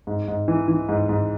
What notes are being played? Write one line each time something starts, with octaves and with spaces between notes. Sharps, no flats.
G#2
G#2
E3
E3
G#2
G#2